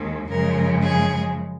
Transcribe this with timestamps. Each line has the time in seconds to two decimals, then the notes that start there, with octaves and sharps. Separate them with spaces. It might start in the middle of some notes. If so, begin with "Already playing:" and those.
Already playing: D#2 D#3 G#3
0.28 F#2 C#3 F3 G#3 A#4
0.81 G#4